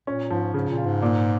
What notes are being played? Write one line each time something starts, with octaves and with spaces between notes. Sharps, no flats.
A#2 C#4
G#2 F3
G#2 C#3
A#2
F4
G#2
A#2